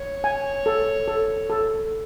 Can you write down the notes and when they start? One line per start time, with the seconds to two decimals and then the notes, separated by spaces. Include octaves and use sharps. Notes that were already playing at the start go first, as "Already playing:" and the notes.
Already playing: C#5
0.24 G#5
0.66 A4
1.08 A4
1.50 A4